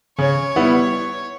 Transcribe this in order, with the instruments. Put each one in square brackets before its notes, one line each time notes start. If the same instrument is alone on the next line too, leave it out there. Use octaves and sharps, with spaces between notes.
[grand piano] C#3 [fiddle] C#5
[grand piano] G3 B3 E4